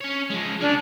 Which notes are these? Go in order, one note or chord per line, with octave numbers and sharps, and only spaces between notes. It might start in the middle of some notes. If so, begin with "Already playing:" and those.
C#4 C#5
F3 G#3
C#4 D4 G#4